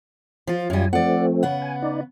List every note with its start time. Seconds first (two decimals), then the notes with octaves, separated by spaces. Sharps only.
0.47 F3 F4
0.70 F#2 G3 F4 G#5
0.93 F3 A3 C4 D5 F#5
1.43 C#3 B3 F#5
1.62 G#5
1.82 D#4 D5